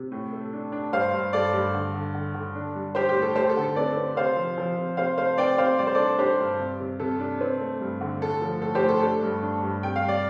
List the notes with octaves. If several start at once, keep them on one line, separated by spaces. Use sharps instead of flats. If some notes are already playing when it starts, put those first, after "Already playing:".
Already playing: C3
A2
A3
D4
D4
G2 C5 F5
G2
G2 A4 D5
G2
D3
D3
D3
D3
D4
G3
G3 G4 C5
G4
A2
A4
A3 G4 C5
A4
D3
A4
C4 A4 D5
C4
C3 C5 F5
F3
F3
C3
C3 C5 F5
A3 C5 F5
C4 D5 G5
C3 C5 F5
G3 D5
C5
A4 D5
D4
D4 G4 C5
G2
C3
C3
C3 A4
D4
C4
A3
G2
D3
A2 A4
F3
A2 A4
G4 C5
A2
A4
D4 A4
G2
D4
G2
C3 G5
F5
G3
D5